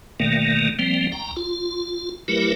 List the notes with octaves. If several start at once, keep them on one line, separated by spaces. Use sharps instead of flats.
G1 B2 D#3 A3 A#3
F3 G3 A#3 C4
C#2 G5 A#5
F4
F#3 A3 E4 G4 A#4 B4